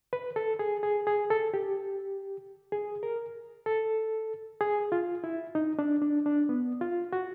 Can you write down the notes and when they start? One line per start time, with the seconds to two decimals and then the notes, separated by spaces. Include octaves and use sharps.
0.13 B4
0.36 A4
0.59 G#4
0.83 G#4
1.07 G#4
1.30 A4
1.54 G4
2.72 G#4
3.03 A#4
3.66 A4
4.61 G#4
4.92 F4
5.24 E4
5.55 D#4
5.79 D4
6.02 D4
6.26 D4
6.49 B3
6.81 F4
7.13 F#4